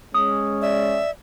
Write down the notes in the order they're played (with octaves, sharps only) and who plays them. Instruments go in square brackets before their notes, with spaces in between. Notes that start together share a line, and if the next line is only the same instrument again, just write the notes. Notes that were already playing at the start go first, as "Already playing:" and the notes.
[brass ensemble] G#3 C#4 [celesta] D#6
[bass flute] D5 [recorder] E5